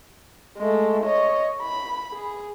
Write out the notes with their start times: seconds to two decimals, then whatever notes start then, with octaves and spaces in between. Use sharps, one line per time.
0.58 G#3 A3
1.04 C#5 D#5
1.62 B5
2.13 G#4